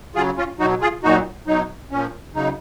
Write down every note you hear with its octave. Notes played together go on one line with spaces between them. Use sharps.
C#3 F#3 F4 G#4
C#4 F4
B2 F#3 D#4 F#4
F4 G#4
A#2 F#3 D#4 F#4
B2 F#3 D#4
A#2 F3 C#4
C#3 F#3 D#4